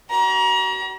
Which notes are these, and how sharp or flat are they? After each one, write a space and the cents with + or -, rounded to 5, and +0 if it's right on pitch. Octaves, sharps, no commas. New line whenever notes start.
F#4 +40 A#5 +35